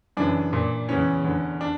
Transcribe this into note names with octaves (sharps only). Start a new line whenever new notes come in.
F#2 C#3 E3 D4
A#2
E2 C#3 E3 C#4
E2 D3
D4